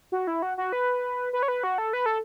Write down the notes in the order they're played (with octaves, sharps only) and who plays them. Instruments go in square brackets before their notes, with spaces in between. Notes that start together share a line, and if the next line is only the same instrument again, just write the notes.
[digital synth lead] F#4
E4
F#4
F#4
B4
B4
C#5
B4
F#4
A4
B4
A4